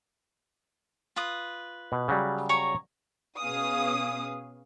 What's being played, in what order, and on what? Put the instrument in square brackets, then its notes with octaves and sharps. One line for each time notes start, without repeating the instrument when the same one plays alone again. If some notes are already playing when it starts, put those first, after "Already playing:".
[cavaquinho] F4 B4 D#6
[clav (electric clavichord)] B2
C#3 F#3 G3
[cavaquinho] C#5 A#5 C#6
[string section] B2 C#4 G#4 B4 F5 D#6